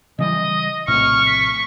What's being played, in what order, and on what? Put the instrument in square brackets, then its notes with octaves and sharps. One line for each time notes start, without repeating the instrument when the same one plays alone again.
[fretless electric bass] C#3 E3 G3 [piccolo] D#5
[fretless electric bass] A#1 A2 C3 [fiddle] C#6 [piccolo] F6
[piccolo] B6